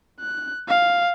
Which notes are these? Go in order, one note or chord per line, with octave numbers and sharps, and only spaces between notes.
F#6
F5